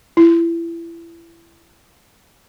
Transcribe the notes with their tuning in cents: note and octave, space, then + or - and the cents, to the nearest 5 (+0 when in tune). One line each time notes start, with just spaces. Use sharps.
E4 +25